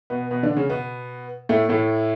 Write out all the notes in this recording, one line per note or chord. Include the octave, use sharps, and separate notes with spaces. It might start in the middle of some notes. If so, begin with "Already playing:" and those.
B2 B3
B2 B3
D3 D4
C#3 C#4
B2 B3
A2 A3
A2 A3